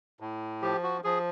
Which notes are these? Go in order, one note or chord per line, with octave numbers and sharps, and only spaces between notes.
A2
F3 G4
F#4
F3 G#4